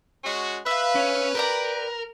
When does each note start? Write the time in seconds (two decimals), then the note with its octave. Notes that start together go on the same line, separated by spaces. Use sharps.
0.24 G#3 C#4 F#4
0.66 B4 E5 F5
0.95 C#4
1.35 G4 A#4 D5 A#5